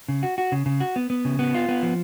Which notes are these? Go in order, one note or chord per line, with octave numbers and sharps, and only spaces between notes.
C#3
F#4
F#4
C#3
C#3
F#4
B3
B3
C#3
B3
F4
B3
F3